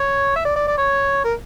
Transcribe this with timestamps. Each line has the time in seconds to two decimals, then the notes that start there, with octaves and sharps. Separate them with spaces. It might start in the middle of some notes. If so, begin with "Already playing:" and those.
Already playing: C#5
0.36 E5
0.45 D5
0.56 D5
0.67 D5
0.78 C#5
1.24 A#4